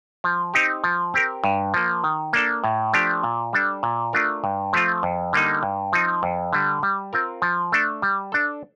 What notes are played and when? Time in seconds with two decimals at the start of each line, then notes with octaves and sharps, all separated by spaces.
0.24 F3
0.54 C4 D#4 G4
0.84 F3
1.14 C4 G4 A#4
1.44 G2
1.74 F3 A#3
2.04 D#3
2.33 A#3 D4 A4
2.64 A2
2.93 F3 A3 D4 G4
3.23 A#2
3.53 G3 D4 A4
3.83 A#2
4.13 A3 D4 F4 A#4
4.44 G2
4.73 F3 A3 C4 F4
5.03 F2
5.33 D3 G3 A#3 D#4
5.63 G2
5.93 F3 C4 D#4
6.23 F2
6.53 D3 G3
6.83 G3
7.13 C4 F4 A#4
7.42 F3
7.72 A3 D4 A4
8.02 G3
8.32 D4 A4